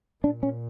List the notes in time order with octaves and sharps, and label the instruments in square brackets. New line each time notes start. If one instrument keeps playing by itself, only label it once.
[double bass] A#2 [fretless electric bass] D4
[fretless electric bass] C#4